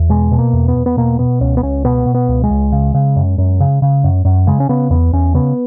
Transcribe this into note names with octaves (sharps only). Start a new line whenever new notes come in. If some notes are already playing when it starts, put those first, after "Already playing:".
Already playing: E2
B2 G#3
B2
A#3
E2
B3
E2
B3
B2 A#3
B2 B3
C#2 C#4
B3
C#2 C#4
B2 B3
B2
B3
C#2
G#3
C#2
C#3
C#3
F#2
F#2
C#3
C#3
F#2
F#2
C#3 G#3
C#4
C#3 B3
E2 B3
E2 C#4
C#3 B3